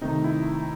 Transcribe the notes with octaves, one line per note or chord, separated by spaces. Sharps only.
C3 D#3 A3 D#4
E4